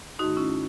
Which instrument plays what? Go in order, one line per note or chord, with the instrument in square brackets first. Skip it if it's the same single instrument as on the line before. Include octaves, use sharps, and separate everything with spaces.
[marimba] G#2 D#3 A3 D#4 F#4
C#4 E4